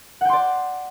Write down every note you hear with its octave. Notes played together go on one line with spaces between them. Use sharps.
D5 F#5 G5 C6